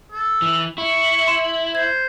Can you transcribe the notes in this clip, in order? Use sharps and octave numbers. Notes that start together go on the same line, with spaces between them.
A4
E3
E4 C#6
C6 E7
C5 G#6